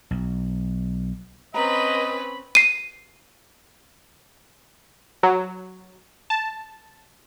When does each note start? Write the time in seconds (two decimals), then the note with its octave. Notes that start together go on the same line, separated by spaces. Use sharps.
0.11 B1
1.54 C4 C#4 B4 D#5 A#5 B5
2.55 C7 D#7
5.23 F#3
6.30 A5